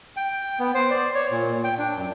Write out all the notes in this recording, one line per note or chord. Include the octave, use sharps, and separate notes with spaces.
G5
B3
C5
D5
C#5
A#2
G5
D4
F#2